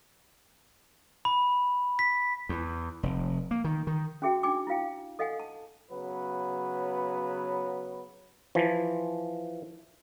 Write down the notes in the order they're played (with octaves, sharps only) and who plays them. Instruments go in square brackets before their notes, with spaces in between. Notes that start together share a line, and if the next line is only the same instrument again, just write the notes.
[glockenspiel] B5
B6
[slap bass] E2
F1
A#3
D#3
D#3
[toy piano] C#4 F#4 G#4 E5 G5
D4 D#4 G5 G#5 D6
E4 F4 F5 G5
A4 D#5 F5 F#5 G#5
A5
[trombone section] C#3 F#3 B3 B4
[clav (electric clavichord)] E3 F3